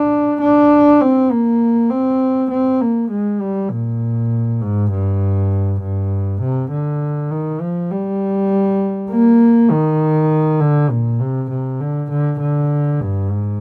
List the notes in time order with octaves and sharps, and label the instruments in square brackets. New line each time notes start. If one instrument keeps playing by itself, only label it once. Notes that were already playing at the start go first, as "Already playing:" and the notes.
Already playing: [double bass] D4
D4
C4
A#3
C4
C4
A#3
G#3
G3
A#2
G#2
G2
G2
C3
D3
D#3
F3
G3
A#3
D#3
D3
A#2
C3
C3
D3
D3
D3
G2
G#2